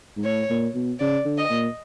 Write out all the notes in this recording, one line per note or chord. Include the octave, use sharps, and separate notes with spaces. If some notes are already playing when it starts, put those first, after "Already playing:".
G#2
A2 C#5
A#2
B2
C#3 D5
D3
D#5
A#2